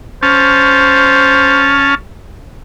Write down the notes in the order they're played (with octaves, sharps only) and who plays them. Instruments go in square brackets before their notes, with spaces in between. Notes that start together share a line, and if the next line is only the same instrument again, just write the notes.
[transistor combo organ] C#4 A5 F6 [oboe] C5